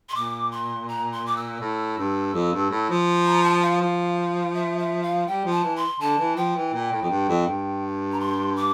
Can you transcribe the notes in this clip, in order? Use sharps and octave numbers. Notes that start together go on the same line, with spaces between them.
C6
A#2 D6
C6
A#5
C6
D6
E6
A2
G2
F2
G2
A2
F3
A#5
A5
F5
F3
E5
E5
F5
G3 G5
F3
A5
E3
C6
D3 A5
E3
F3 G5
E3
A#2
A2
F2
G2
F2
G2
A#5
C6
D6